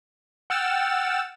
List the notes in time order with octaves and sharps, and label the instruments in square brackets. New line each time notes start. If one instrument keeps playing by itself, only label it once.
[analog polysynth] F#5 G5 E6 F6 A6 E7